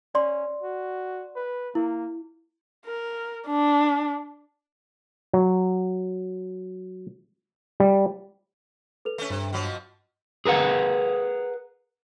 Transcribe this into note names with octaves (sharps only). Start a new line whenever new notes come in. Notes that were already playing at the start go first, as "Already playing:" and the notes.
C#4 D5 C6
F#4
B4
A#3 E4
A#4
D4
F#3
G3
A4 B4 F7
A3 C#4
G2 C3
B2 F3 F#3
G#4 A#4 B4 F#5